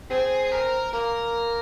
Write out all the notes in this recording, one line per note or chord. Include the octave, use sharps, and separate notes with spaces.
C4 G#4
A#4
A#3 A#4